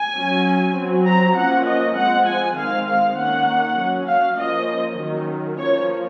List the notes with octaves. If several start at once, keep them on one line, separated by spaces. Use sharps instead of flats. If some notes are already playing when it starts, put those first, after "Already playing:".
Already playing: G#5
F#3 C#4
F#3 C4
A#5
F3 A#3 C#4 F#5
D#5
F3 G#3 C4 F#5
G#5
D#3 G#3 C4 F5
F5
D#3 A#3 C#4 F#5
F#3 C#4
F5
F3 A#3 C#4 D#5
D#3 F#3 C#4
F3 A#3 C#4 C#5